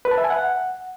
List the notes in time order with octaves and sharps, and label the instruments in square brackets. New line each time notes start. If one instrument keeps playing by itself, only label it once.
[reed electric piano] B4
A5
E5
G#5
F#5